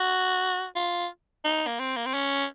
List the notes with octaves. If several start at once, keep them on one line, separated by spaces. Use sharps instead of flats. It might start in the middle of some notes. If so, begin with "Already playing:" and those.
Already playing: F#4
F4
D#4
A#3
C4
A#3
C4
C#4